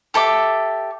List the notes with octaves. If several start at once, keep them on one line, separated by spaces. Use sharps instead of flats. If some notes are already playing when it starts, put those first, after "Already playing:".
G4 A4 E5 D6